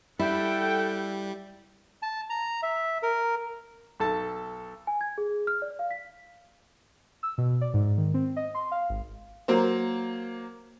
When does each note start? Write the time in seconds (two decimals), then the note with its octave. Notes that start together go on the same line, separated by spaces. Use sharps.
0.19 G3 E4 A4 F#5 G5
2.02 A5
2.30 A#5
2.63 E5
3.03 A#4
4.00 B1 A4 A5
4.87 G#5
5.01 G#6
5.18 G#4
5.47 F6
5.62 D5
5.79 F5
5.91 B6
7.23 E6
7.38 B2
7.61 D5
7.74 G#2
7.98 D#3
8.14 C4
8.36 D#5
8.55 C6
8.72 F5
8.90 G#1
9.48 F#3 A#3 C5